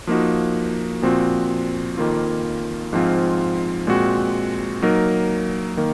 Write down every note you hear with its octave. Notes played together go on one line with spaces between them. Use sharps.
F3 A#3 D#4 F#4
A#2 F3 C4 F#4
F2 D#3 A#3 F4
G#2 F3 C4 F4
A#2 G#3 C4 F#4
F#3 A#3 D#4 A#4
D#3 A#3